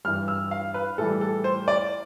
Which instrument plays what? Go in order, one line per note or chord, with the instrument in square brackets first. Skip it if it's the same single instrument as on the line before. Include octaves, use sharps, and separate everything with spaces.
[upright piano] G2 E3 G3 F6
E6
F5
B4
A2 E3 G3 A4
A4
C5
D5